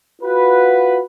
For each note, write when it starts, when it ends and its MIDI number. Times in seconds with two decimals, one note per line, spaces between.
0.22 1.00 65
0.22 1.00 66
0.22 1.00 71